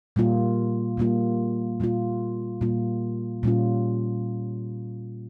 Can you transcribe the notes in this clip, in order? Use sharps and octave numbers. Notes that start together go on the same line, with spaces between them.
A#2 G3 A#3 F4
A#2 G3 A#3 F4
A#2 G3 A#3 F4
A#2 G3 A#3 F4
A#2 G3 C#4 F4